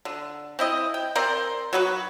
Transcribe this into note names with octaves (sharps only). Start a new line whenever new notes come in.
D3
C4 E4 D#5
G5
C4 A#4 C5 D5
F#3 D#4 F#4 B4